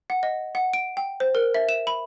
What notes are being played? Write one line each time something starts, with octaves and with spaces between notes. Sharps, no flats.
F#5
D#5
F#5
D7
G5
C5
A#4
E5
E7
B5